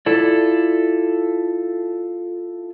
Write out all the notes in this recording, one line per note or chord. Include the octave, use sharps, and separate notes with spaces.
E4 F4 A4 D5